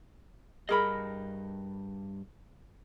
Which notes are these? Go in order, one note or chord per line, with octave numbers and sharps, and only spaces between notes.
G2 G#4 A#4 D#5 B5